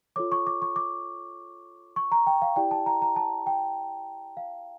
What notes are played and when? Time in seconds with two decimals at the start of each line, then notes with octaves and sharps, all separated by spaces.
0.16 F4 A4 C#5 D6
0.32 C#6
0.47 D6
0.62 C#6
0.76 D6
1.96 C#6
2.12 A#5
2.27 G5
2.42 F5
2.56 E4 G4 D5 G5
2.71 A5
2.86 A#5
3.02 A#5
3.16 A5
3.47 G5
4.37 F5